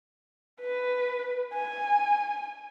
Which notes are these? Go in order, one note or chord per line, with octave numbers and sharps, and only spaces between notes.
B4
G#5